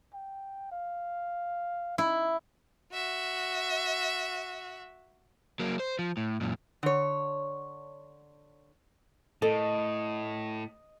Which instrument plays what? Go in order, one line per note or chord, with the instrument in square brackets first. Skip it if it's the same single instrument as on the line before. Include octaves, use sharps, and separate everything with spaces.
[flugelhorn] G5
F5
[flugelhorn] D#4 [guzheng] E4
[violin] F#4 E5
[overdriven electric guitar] F#3 A#3
C5
F3
A2
F#2 A#2
[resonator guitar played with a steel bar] D3 C#5
[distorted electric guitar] A2 [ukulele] A4 [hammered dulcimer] D#5